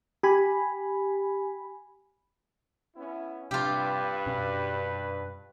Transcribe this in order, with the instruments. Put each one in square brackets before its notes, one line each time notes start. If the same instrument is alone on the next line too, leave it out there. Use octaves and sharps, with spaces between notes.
[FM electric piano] G4 G#5 B5
[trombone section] B3 C#4 E4
[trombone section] G2 [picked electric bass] C3 [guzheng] F4 G4 [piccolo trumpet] B4
[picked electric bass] F#2 B2 C#4